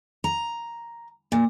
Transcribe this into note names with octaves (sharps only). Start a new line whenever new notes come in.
A#5
A#2